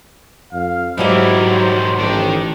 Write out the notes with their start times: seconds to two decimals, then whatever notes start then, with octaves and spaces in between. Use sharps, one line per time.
0.53 F2 F5
0.98 G#2 D#3 E3 F#3 E4 G4 D5
1.50 C5
1.98 A1 D#3 D4 G5